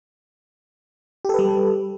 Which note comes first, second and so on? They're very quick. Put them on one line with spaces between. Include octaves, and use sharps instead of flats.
G4 A4 B4 G3